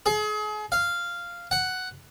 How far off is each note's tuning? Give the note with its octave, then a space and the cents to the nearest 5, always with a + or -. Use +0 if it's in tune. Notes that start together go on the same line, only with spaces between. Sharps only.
G#4 +35
F5 -10
F#5 +5